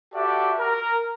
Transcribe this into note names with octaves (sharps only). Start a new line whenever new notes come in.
F#4 G4 A4 D5 E5 F#5
A#4